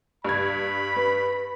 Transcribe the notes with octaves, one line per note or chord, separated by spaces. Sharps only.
G2 B5 G#6
B4